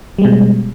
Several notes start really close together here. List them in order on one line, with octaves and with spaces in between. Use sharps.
G3 G#3 B2